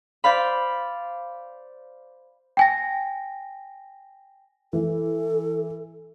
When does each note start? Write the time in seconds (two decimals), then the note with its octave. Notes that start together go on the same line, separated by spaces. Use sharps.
0.24 C5 D5 F5 B5
2.57 G5 G#5 A#6
4.73 E3 A4